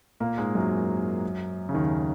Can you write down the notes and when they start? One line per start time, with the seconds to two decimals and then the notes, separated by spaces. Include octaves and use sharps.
0.20 A#2 A#3
0.38 G#2 G#3
0.55 F#2 F#3
1.69 C#3
1.74 D#2 D#3